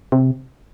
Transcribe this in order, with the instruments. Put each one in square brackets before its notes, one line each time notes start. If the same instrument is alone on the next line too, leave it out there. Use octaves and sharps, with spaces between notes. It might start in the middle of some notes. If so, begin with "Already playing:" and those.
[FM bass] C3